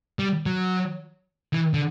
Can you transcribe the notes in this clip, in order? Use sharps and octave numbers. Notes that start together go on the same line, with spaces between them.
G3
F#3
E3
D3